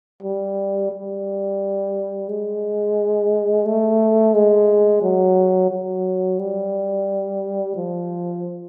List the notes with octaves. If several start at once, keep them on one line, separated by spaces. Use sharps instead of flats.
G3
G3
G#3
A3
G#3
F#3
F#3
G3
F3